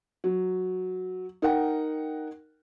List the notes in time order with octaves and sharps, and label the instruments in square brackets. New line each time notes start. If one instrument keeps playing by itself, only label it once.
[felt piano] F#3
D#4 A#4 F#5 G5